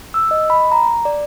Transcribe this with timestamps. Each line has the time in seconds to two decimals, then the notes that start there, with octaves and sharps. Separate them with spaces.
0.14 E6
0.31 D#5
0.50 B5
0.72 A#5
1.05 D5